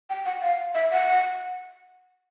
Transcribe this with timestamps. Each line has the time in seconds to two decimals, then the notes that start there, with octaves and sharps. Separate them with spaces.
0.10 G5
0.26 F#5
0.42 F5
0.75 E5
0.92 F#5